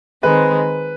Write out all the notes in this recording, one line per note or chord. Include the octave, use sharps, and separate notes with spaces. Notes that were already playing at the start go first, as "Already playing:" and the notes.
D#3 G#3 C4 B4